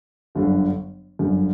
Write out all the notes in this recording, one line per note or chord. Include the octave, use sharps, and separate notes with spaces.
G1 F#2 D3
G1 F#2 D3